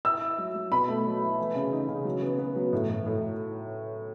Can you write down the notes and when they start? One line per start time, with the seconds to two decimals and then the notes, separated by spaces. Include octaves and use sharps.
0.05 E4 E6
0.21 E4
0.38 F#3
0.55 F#3
0.71 B2 B5
0.88 A3
1.05 F#3
1.22 E4
1.39 E3
1.55 C#3
1.72 D#4
1.88 C#3
2.05 F#3
2.22 B3
2.38 B3
2.56 F#3
2.73 A2
2.89 A2
3.06 A2